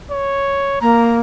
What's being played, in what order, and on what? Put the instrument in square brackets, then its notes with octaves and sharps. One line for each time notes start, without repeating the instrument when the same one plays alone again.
[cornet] C#5
[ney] A#3 [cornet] A#5